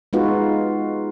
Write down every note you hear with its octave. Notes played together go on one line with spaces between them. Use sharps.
G#3 B3 D#4 F4 F#4 B4